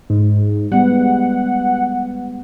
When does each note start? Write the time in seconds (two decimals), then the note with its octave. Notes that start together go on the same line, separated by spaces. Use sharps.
0.10 G#2
0.72 G3 G#3 B3 F#5